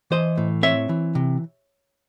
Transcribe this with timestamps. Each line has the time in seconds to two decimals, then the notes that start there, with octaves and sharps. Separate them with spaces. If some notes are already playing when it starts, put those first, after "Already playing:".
0.11 E3 C5 D#5
0.37 A2
0.63 C4 C#5 E5
0.89 E3
1.15 C3